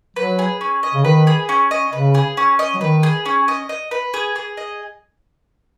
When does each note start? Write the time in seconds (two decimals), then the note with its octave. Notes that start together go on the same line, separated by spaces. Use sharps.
0.16 F#3 B4
0.39 G#4
0.61 C#4
0.83 D#5
0.94 C#3
1.04 D#3 B4
1.27 G#4
1.49 C#4
1.71 D#5
1.93 C#3 B4
2.15 G#4
2.37 C#4
2.59 D#5
2.74 F#3
2.81 D#3 B4
3.03 G#4
3.26 C#4
3.48 D#5
3.69 D#5
3.91 B4
4.14 G#4
4.36 G#4
4.57 D#5